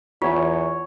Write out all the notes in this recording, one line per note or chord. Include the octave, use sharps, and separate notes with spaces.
E2 F4 C#5